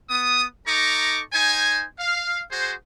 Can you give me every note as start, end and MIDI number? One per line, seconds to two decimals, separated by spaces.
0.10 0.46 59
0.10 0.46 87
0.67 1.21 63
0.67 1.21 69
0.67 1.21 82
0.67 1.21 85
0.67 1.21 86
1.33 1.84 63
1.33 1.84 72
1.33 1.84 80
1.99 2.42 77
2.51 2.73 66
2.51 2.73 68
2.51 2.73 72